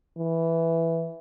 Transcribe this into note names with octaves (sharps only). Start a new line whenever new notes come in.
E3